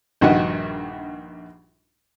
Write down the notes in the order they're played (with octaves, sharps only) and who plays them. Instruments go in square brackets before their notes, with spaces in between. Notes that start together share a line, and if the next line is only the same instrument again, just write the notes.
[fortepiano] A#1 G2 D#3 F#4 D#5 F#5